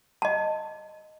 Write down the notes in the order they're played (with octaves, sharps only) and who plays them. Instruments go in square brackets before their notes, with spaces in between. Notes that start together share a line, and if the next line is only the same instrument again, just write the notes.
[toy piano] D#5 A5